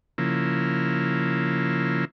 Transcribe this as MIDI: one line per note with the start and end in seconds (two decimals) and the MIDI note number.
0.18 2.05 49
0.18 2.05 53
0.18 2.05 58
0.18 2.05 64